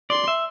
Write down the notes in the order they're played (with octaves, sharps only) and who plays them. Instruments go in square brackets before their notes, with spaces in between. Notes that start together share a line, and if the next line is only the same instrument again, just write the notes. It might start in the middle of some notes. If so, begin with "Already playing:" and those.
[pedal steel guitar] D5 [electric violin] C6
[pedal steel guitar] E5